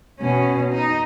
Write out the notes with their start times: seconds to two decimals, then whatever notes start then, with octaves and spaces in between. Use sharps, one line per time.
0.20 B2 C#4
0.73 D#4